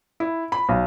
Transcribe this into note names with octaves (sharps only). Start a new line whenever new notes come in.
E4
B5
B1